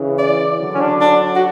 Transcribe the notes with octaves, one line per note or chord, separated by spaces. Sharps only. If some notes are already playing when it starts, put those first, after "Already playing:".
Already playing: C#3 E3
D5
D3 F#3
C#4
D4
D4
F#4